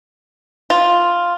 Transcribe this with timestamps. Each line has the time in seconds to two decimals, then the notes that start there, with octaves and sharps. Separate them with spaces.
0.70 F4